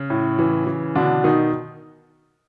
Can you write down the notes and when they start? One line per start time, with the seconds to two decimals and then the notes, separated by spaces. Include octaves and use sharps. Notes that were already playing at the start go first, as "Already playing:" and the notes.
Already playing: C#3
0.10 A2
0.39 E3
0.67 E3
0.95 B2 D3 D4
1.24 B2 D#3 D#4